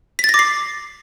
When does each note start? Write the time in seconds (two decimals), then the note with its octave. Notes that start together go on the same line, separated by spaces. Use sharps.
0.19 B6
0.24 A6
0.29 A#6
0.34 D6
0.39 C7